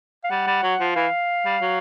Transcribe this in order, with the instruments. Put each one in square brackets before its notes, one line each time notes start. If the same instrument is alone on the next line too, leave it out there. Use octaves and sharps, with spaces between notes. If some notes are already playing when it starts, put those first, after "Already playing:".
[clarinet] F5
[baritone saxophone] G3 [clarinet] F#5
[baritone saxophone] G3
F#3
F3
[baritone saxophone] E3 [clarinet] F5
[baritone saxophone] G3
F#3